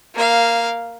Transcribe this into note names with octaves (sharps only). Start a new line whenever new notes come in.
A#3 F5